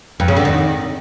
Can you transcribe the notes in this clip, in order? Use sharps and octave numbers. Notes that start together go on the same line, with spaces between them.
F2
C#3
D3
D#3